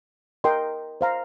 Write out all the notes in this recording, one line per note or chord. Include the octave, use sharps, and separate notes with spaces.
A#4 D#5 G5 C6
C5 F5 A#5